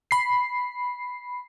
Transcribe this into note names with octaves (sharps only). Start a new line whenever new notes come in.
B5 C7